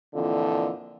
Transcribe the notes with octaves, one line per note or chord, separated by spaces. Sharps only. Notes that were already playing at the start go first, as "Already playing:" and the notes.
F2 A#2 D3 E3